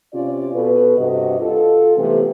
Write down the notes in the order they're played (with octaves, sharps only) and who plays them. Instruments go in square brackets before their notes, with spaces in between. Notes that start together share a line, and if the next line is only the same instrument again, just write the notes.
[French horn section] C3 C#4 F4 D5
B2 A4 B4
G2 C3 F#4 D#5
F4 A4
C3 E3 A3 B3 C4